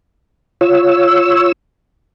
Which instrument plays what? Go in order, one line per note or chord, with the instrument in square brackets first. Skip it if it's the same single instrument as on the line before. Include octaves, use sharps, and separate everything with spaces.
[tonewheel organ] F4 C#5 E6